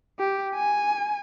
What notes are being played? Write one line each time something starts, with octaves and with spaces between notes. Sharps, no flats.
G4
G#5